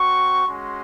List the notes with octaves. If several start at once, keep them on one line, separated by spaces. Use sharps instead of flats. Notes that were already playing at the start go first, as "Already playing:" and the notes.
Already playing: C4 F#4 C#6
G#3 C#4 F#4 C6